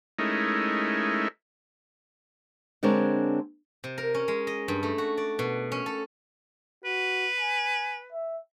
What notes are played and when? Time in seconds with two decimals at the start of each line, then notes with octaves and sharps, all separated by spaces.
0.19 G#3 A3 C#4 D#4 E4 A#4
2.83 D3 G#3 C4 D4 A#4 C#5
3.84 C3
3.98 A#4
4.15 C#4
4.28 G#3
4.47 D#5
4.68 G2
4.83 A3
4.98 F#4
5.18 D5
5.39 B2
5.72 C#4
5.86 A4
6.85 F#4 B4
7.40 G#5
8.12 E5